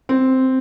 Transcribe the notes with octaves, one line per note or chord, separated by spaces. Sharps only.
C4